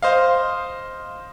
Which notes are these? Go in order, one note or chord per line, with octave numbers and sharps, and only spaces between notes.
C5 D#5 F5